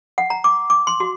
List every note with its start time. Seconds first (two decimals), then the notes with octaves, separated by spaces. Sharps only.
0.18 F#5
0.30 A#5
0.44 D6
0.70 D6
0.87 C6
1.00 F#4